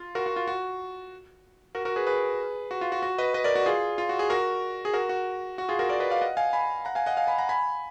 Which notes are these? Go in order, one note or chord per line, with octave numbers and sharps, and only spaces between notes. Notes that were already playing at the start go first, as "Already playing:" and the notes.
Already playing: F4
F#4 A#4
F#4
F4
F#4
F#4 A#4
F#4 A#4
G#4 B4
G#4 B4
F#4
F4
F#4
F#4
B4 D#5
B4 D#5
A#4 D5
F#4
F4 G#4
F4
F#4
G#4
F#4 A#4
G#4
F#4 A#4
F#4
F#4
F4 G#4
F#4 A#4
A#4 D5
B4 D#5
D5 F5
D#5 F#5
F5 G#5
G#5 B5
F#5 A#5
F5 G#5
D#5 F#5
F5 G#5
G#5 B5
F#5 A#5
G#5 B5